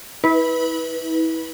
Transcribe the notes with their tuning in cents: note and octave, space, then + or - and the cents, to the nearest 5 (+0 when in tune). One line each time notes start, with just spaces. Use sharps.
E4 -35 B4 -10